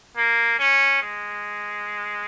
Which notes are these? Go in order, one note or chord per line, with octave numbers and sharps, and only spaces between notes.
A#3
C#4
G#3